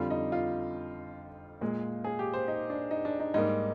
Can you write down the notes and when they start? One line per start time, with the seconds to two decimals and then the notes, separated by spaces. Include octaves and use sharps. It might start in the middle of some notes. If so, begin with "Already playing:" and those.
Already playing: F2 D3 G3 F4
0.10 D#4
0.32 F4
1.61 A#2 G#3
2.04 G#4
2.19 G4
2.34 C5
2.48 D#4
2.70 D4
2.91 D#4
3.05 D4
3.20 D#4
3.34 G#2 G3 A#3 D#4